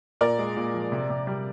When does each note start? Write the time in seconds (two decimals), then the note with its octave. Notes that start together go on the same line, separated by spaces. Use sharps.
0.21 A#2 A#4 D5
0.39 G#3
0.57 A#2
0.74 F3
0.92 C3
1.10 C3
1.27 G3